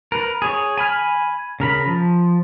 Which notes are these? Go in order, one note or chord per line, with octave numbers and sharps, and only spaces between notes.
A#4 B4
G#4 C#5 C#6
G#5 B5 F6
C#3 A#4 B5
F3